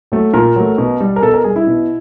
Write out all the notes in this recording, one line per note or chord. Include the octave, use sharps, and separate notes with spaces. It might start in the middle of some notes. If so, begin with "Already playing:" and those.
F#3 A3
A#2 A#4
F#3 A3
B2
G3
A#4
B2 A4
A#4
G3 G#4
E4
B2